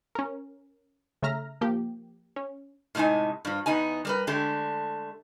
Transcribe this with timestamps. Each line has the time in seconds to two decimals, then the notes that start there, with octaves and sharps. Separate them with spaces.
0.15 C#4 A#4
1.22 C#3 A3 E5 A#5 F6 A#6
1.61 F3 A#3 G4
2.36 C#4
2.95 A2 C3 G#3 D#4 G#5
3.45 G2 F3
3.66 E2 B3 D#4 G#5
4.05 G3 A#4 B4
4.27 D3 G#3 A3 G4